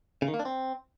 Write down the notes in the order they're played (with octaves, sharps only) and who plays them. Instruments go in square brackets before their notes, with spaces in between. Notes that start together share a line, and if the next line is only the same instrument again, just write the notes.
[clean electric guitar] C#3
D#3
A#3
D4
C4